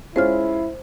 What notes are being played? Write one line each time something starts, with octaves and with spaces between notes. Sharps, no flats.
G#3 C#4 E4 F4 C5 F6